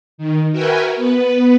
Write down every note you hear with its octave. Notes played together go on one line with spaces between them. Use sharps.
D#3
F#4 A#4 B4 E5 G5 G#5
B3 B4